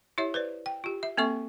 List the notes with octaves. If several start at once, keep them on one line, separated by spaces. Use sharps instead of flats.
E4 G4 C#5 E5
B4 C5 D5
G5
F4 G4
E5
A#3 C4 A4 E5 C#6